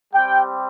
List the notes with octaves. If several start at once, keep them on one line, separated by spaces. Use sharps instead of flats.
G3 C4 G4 G5